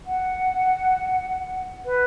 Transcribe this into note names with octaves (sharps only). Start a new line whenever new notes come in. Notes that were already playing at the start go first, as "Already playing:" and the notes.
F#5
B4